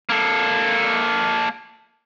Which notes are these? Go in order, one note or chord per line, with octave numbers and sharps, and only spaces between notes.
A#3 A4